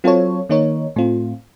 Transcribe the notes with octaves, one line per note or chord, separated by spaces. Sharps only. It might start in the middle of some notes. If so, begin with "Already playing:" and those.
F#3 C4 F4 A4 C#5
D#3 A#3 D#4 A#4 C#5
A2 A3 C4 F4